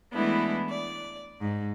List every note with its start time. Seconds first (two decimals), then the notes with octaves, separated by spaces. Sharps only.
0.12 E3 G#3 A3 B3 D4 E4
0.68 D5
1.41 G#2